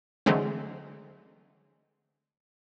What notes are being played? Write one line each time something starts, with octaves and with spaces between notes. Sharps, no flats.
D3 E3 F#3 G#3 A3 C4